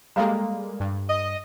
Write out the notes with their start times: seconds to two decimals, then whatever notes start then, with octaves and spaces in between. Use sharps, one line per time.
0.16 G3 G#3 A#3 A4 F5 A#5
0.80 G2
1.09 D#5